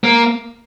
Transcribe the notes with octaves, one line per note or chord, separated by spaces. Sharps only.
A#3